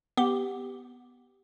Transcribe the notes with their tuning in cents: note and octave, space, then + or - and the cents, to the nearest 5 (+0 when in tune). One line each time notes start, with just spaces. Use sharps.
B3 +0 G4 +0